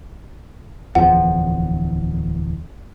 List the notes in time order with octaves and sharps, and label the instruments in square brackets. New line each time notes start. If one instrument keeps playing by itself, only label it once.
[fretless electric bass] D1 E2 F3 [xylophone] F#5